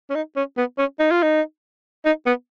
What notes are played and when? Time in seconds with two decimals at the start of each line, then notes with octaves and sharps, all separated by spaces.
0.10 C#4
0.15 D#4
0.36 C#4
0.57 B3
0.78 C#4
0.99 D#4
1.11 F4
1.23 D#4
2.05 D#4
2.26 B3